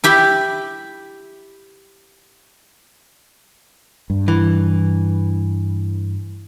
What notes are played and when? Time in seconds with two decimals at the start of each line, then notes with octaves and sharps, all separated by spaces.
0.04 E4 G4 B5
4.10 G2
4.28 E3